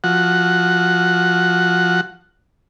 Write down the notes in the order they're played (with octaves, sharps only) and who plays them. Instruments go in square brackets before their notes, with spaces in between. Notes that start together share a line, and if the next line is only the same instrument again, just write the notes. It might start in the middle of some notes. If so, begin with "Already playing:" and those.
[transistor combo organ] F3 F#4 F#5